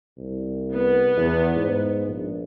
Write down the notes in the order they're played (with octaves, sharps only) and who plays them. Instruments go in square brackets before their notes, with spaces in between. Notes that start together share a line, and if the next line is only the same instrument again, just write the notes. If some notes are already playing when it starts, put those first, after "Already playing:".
[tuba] C2
[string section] B3
[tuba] E2
G#2
A#1